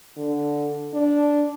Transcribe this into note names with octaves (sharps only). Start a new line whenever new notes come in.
D3
D4